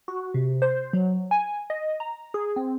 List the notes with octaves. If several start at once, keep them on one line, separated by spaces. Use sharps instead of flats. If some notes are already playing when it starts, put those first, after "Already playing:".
F#4
C3
C5
F#3
G#5
D#5
A#5
G#4
C4